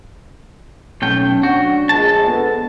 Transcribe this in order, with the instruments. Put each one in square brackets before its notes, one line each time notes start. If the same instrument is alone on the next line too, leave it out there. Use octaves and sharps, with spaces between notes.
[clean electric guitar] B1 A3 G5 [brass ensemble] C#4
[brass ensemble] D4 [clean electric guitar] F#4
[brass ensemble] A#1 G#3 [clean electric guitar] A5
[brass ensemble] B3 A4 B4